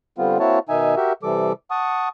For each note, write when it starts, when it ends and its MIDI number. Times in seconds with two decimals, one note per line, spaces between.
0.18 0.38 50
0.18 0.38 55
0.18 0.38 59
0.18 0.38 60
0.18 0.38 65
0.40 0.59 58
0.40 0.59 60
0.40 0.59 64
0.40 0.59 66
0.40 0.59 73
0.40 0.59 81
0.69 0.95 47
0.69 0.95 51
0.69 0.95 63
0.69 0.95 76
0.69 0.95 80
0.97 1.13 66
0.97 1.13 67
0.97 1.13 70
0.97 1.13 76
1.23 1.53 48
1.23 1.53 52
1.23 1.53 55
1.23 1.53 69
1.23 1.53 86
1.71 2.09 78
1.71 2.09 81
1.71 2.09 85
1.71 2.09 87